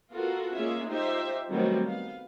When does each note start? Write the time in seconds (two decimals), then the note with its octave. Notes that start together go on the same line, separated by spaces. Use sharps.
0.11 B3 F4 F#4 A4 A#4
0.54 G#3 A#3 C#4 F4 G#4 E5
0.87 D#4 F4 G4 C5 E5
1.50 D#3 F#3 G3 A3 B3 C4
1.84 B3 F5